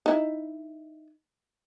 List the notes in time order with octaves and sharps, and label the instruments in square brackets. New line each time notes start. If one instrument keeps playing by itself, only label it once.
[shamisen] D#4 E4